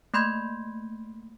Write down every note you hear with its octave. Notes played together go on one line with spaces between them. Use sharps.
A3 A#3 B5 C6 G6 G#6